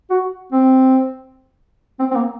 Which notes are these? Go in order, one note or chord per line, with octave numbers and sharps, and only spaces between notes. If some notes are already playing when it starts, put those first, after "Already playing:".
F#4
C4
C4
C4
A#3